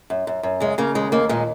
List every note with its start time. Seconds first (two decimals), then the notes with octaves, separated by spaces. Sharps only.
0.10 F#2
0.27 F#2
0.43 F#2
0.60 C#3 G#3
0.78 C#3 A#3
0.95 D#2 G#3
1.12 D#2 A#3
1.29 A#2 G#3